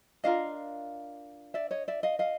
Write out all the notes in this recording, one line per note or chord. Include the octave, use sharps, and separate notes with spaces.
D4 F4 A#4 D#5 F5
D5 E5
C#5 D#5
D5 E5
D#5 F5
D#5 F5